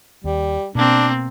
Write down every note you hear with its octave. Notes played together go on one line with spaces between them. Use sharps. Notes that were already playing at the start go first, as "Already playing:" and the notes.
D#2 G3
B2 A#3 C4 D4